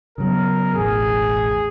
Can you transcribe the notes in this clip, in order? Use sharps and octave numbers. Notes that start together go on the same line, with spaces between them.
C#3 F#3 B3 A#4
E1 A1 G#4